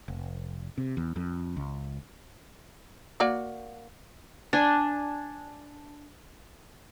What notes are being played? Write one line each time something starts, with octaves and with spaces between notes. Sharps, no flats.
F1
C3
E2
F2
C#2
A#3 F#4 D5
D4 G#5